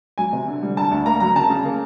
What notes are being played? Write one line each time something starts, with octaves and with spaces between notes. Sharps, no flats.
F#3 G#5
C3
D3
G3
D3 A5
D2
A#3 A#5
F#3 A#5
C#3 A5
C#3
A#3